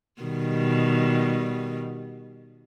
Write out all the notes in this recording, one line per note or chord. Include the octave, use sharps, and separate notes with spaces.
B2 D#3 G3